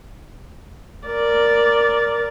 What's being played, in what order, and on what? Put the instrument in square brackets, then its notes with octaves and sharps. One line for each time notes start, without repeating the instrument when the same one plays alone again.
[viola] A#4 D5